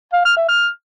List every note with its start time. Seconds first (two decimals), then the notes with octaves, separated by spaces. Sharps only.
0.13 F5
0.25 F6
0.37 E5
0.49 F6